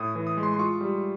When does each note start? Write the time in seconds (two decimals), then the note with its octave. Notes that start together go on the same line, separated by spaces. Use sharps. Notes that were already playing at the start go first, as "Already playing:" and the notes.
Already playing: A2 D#6
0.15 E3
0.27 D#6
0.37 G#3
0.43 C6
0.54 C6
0.59 F4 C#6
0.81 G3